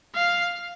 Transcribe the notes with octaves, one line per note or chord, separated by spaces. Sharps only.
F5